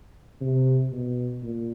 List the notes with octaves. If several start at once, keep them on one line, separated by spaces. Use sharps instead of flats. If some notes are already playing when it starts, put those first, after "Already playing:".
C3
B2
A#2